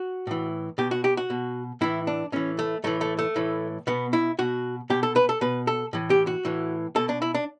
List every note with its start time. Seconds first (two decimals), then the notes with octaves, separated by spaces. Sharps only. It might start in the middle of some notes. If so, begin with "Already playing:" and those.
Already playing: F#4
0.27 A2 E3
0.78 B2 G4
0.91 F#4
1.04 G4
1.17 F#4
1.30 B2
1.81 A2 E3 E4
2.07 D4
2.32 A2 E3 C#4
2.59 A3
2.84 A2 E3 A3
3.01 A3
3.19 A3
3.36 A2 E3
3.87 B2 B3
4.13 E4
4.39 B2 F#4
4.90 B2 G4
5.03 A4
5.16 B4
5.29 A4
5.41 B2 B4
5.67 A4
5.93 A2 E3
6.10 G4
6.27 F#4
6.45 A2 E3
6.96 B2 A4
7.09 D4
7.22 E4
7.35 D4